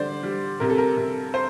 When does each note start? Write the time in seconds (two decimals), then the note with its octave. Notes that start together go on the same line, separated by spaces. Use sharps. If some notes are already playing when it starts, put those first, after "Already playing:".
Already playing: D3 G3 C5 D5
0.23 G3
0.60 C3 A#4
0.70 A4
0.78 A#4
0.97 C3
1.34 C5